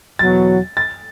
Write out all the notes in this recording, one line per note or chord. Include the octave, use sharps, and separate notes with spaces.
E2 B2 F#3 A6
A6